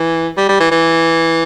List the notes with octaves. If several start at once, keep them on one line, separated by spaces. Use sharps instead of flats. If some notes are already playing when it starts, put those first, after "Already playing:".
Already playing: E3
G3
G3
E3
E3